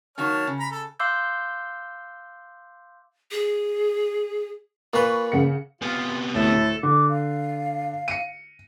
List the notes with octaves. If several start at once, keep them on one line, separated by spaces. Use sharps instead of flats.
D#3 F#3 A#3 C#5 A5 F6
C#3
A#5 B5
A4
F5 C6 D6 E6 F#6 G6
G#4
A#2 B4 B5 C#6
C#3 F#5 C#7
C3 B3 F4
D2 A2 A3 A4
D3 D6
F5
C#7 D#7